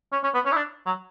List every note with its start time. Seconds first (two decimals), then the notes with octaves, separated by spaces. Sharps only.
0.12 C#4
0.23 C#4
0.34 B3
0.45 C#4
0.52 E4
0.56 D4
0.86 F#3